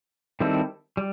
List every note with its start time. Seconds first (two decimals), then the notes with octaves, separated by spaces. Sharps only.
0.40 D#3 G3 C4 E4 A4
0.97 G3